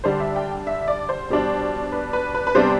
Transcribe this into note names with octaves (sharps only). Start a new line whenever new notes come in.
D3 G3 D4 C5
E5
G5
E5
D5
C5
B2 G3 D4
B4
B4
B4
B4
C3 G3 B3 D4 C5